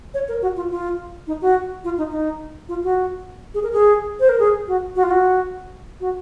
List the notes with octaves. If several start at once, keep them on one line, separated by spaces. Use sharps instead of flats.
C#5
A#4
F#4
F4
F4
D#4
F#4
F4
D#4
D#4
F4
F#4
G#4
A#4
G#4
C5
A#4
G#4
F#4
F#4
F4
F#4
F#4